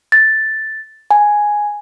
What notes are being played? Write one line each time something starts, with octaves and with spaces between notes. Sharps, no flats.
A6
G#5